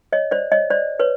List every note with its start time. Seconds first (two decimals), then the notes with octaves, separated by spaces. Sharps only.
0.12 C#5 D#5
0.31 C5 D5
0.52 C#5 D#5
0.70 C5 D5
1.00 B4 C#5